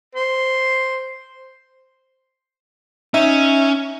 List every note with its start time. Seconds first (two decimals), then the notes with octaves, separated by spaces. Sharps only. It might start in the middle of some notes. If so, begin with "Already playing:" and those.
0.15 C5
3.14 C#4 D#4 E5 D#7